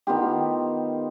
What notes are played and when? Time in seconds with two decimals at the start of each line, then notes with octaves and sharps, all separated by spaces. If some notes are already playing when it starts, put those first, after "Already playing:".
0.07 D#3 B3 F4 G4